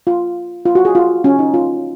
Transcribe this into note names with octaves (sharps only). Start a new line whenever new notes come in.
F4
F4
F#4
G#4
F4
C#4
D#4
F4